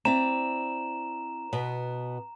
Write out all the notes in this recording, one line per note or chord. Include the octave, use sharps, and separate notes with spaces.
C4 E4 D5 A#5 E7
B2 B3